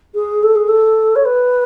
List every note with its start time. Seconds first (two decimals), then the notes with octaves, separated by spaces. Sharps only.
0.14 G#4
0.43 A4
0.55 G#4
0.68 A4
1.15 C#5
1.25 B4